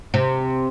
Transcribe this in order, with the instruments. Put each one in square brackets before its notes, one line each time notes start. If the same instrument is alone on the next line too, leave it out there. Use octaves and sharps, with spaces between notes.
[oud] C3